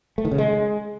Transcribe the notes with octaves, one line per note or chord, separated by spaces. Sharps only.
A3
D#3
C#3
G#3